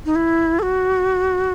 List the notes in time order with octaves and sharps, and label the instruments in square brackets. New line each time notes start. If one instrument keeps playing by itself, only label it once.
[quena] D#4
E4
A4
F#4